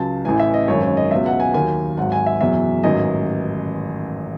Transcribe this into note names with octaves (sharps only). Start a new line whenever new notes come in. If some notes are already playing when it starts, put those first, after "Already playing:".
Already playing: C#2 C#3 F#3 A5
A1 A2 E3 G#5
E5
D#5
G#1 F#2 D#3 C#5
C#5
D#5
C#2 B2 F#3 E5
F#5
G#5
D#2 D#3 F#3 G#5
G#1 G#2 F#3 F#5
G#5
E5
F#1 E2 B2 F#3 E5
A1 G#2 D#3 F#3 D#5